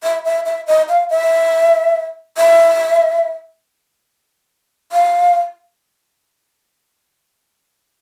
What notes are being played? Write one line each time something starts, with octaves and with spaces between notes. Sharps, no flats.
E5
E5
E5
D#5
F5
E5
E5
F5